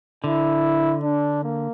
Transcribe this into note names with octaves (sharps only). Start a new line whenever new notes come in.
D3 E4
D4
A#3